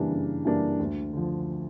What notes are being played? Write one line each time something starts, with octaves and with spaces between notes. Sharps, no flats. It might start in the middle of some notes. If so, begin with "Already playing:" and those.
Already playing: C#3 E3 G3 A#3 D4
C#3
E3 G3 A#3 D4
D2
D3 F3